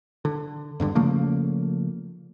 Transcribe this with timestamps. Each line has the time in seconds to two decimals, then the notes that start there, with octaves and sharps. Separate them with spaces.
0.25 D3
0.80 E2 G2 D3
0.95 C#3 F3 A3 A#3